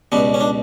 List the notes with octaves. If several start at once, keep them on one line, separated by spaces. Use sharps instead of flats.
C#2 B2 G3 B3
C#4
D4